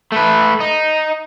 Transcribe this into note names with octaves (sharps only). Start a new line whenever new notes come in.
A3 B4
D#4